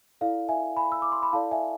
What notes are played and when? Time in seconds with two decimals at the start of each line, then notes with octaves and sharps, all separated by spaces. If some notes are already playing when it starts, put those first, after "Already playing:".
0.21 E4 A4 D5 F5
0.48 E5 G#5
0.77 G#5 B5
0.92 E6
1.02 D6
1.12 C6
1.22 B5
1.33 E4 A4 D5 F5 A5
1.51 E5 G#5